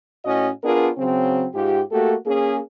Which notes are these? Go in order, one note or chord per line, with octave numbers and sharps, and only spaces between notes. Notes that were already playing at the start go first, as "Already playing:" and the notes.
A2 C#4 F#4 D#5
B3 D4 F4 G#4 A#4
C#3 F#3 C4
G#2 F4 G4
A3 A#3 F#4 G4 A4
A#3 C#4 G#4